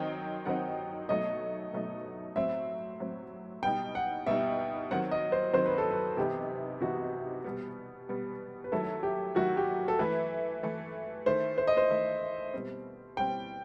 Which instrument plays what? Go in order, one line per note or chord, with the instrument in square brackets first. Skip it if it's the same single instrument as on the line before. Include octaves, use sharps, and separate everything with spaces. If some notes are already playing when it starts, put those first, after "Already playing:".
Already playing: [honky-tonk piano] D#3 F#3 C4 D#4 [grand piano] G5
[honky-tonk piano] D#3 F#3 C4 D#4 [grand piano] F#5
[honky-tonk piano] B2 F#3 A3 D#4 [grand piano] D#5
[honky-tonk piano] B2 F#3 A3 D#4
[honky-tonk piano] A2 F#3 C4 [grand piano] E5
[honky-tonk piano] A2 F#3 C4
[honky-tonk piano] B2 G3 D#4 [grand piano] G5
[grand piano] F#5
[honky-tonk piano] B2 G3 D#4 [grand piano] E5
[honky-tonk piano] D#3 F#3 C4 [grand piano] F#5
[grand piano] D#5
C5
[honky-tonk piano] D#3 F#3 C4 [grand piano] C5
[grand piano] B4
A4
B4
[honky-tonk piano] C3 E3 B3 D#4 [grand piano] G4
[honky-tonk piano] C3 E3 B3 D#4 [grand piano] F#4
[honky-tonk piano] B2 G3 B3
B2 G3 B3
[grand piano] B4
[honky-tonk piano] D#3 F#3 A3 E4 [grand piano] A4
[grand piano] G4
[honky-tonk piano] D#3 F#3 A3 E4 [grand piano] F#4
[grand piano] G4
A4
[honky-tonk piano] E3 A3 E4 [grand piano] B4
[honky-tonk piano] E3 A3 E4
[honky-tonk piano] D#3 A3 E4 [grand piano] C5
[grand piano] C5
D#5
C5
[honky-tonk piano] D#3 A3 E4
B2 G3 C4
[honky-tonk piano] B2 G3 C4 [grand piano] G5